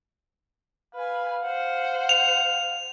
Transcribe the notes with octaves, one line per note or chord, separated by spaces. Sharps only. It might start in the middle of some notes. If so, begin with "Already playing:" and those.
B4 F5 G#5
C5 F#5
F7